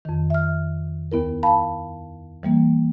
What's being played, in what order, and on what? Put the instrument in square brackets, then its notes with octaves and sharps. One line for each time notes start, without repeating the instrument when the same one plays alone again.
[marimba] F2 D#3
E5 F6
D#2 B3 E4 A#4
F5 A5 B5
E3 G3 A#3